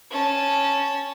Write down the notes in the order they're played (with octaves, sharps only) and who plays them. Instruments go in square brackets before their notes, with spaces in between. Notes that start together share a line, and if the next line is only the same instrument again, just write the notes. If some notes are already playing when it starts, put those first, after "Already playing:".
[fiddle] C#4 A5